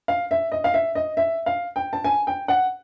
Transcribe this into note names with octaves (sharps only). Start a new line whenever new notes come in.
F5
E5
D#5
F5
E5
D#5
E5
F5
G5
A5
G#5
G5
F#5